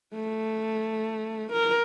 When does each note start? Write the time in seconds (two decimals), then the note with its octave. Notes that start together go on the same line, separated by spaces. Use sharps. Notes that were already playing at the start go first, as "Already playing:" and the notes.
0.15 A3
1.53 A#4